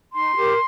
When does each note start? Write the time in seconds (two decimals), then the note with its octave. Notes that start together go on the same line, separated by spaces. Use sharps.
0.14 D#4 C6
0.35 G4 A#4